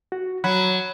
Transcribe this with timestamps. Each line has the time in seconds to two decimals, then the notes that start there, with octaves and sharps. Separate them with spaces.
0.12 F#4
0.44 F#3 F#5 B5